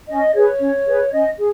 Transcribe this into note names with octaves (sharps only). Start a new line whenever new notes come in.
C#4 D#5
G#4 B4 C#5
C#4
G#4 B4
C#4 D#5
G#4